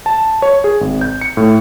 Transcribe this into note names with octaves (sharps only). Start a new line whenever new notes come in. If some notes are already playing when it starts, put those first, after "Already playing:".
A5
C#5
G#4
G#1
G6
C#7
A2